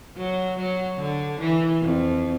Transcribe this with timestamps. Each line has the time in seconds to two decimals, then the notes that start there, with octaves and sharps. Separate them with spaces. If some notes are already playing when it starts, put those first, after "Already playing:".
0.16 F#3
0.59 F#3
0.98 D3
1.40 E3
1.81 F2